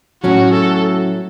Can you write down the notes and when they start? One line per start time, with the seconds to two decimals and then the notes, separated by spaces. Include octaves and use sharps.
0.24 A2 F#3 C#4 F#4
0.53 A4